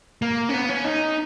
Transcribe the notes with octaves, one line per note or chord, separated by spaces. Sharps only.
A#3
C#4
B3
C#4
D#4